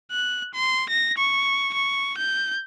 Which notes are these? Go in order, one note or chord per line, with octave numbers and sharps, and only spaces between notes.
F#6
C6
A#6
C#6
C#6
G6